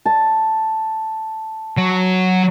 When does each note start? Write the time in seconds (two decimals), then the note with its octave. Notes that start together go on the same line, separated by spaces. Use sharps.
0.06 A5
1.78 F#3 F#4